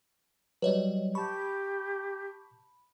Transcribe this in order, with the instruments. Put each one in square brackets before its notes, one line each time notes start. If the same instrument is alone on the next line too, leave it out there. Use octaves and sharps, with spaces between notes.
[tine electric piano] F#3 G3 [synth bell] B4 C#5 D#5
[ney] G4 [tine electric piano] A5 C#6 [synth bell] B5